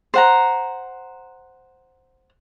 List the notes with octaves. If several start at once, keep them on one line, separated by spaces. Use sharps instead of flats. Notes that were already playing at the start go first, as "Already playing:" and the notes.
C5 F#5 A#5